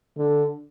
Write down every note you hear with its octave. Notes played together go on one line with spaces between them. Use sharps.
D3